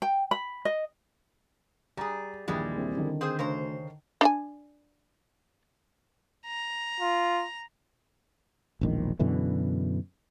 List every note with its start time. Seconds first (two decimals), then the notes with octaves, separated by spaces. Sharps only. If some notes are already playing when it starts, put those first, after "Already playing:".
0.02 G5
0.31 B5
0.65 D#5
1.97 G3 G#4 A#5
2.48 A#1 D#2 E3 G3 G#3 E4
2.77 C2
2.97 D3 D#3
3.21 C4 G#4 C5
3.39 D2 C#3 C5 A#5
4.21 D4 E5 G#5
6.46 A#5
7.00 F4
8.81 E1 A#1 D#3
9.19 F#2 B2 D3 E3